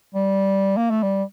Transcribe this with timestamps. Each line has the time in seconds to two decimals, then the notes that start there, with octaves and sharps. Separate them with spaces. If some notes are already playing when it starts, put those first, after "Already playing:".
0.15 G3
0.77 A#3
0.90 A3
1.03 G3